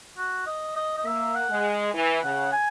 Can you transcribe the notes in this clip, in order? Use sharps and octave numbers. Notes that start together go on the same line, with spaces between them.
F#4
D#5
D#5
D#5
A#3 E5
F#5
G#3
E3
C#3 F#5
G#5